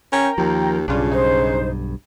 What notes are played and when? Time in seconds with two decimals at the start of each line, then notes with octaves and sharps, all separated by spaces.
0.12 C#4 A#4 G5 A#5
0.38 D#2 F3
0.88 B1 G2 C#3 D4 F4
1.12 D#4 C5